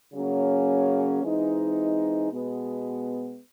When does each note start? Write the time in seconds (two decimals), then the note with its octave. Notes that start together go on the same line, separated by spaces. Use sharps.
0.13 C#3 F#3 A#3 C#4
1.23 E3 G#3 C4 D#4
2.32 B2 G#3 B3